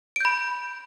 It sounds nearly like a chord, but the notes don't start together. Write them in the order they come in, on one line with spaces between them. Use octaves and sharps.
D7 G6 B5